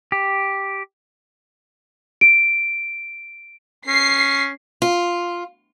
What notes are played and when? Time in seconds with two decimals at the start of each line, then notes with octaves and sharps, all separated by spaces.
0.12 G4
2.21 D7
3.87 C#4 C7
4.82 F4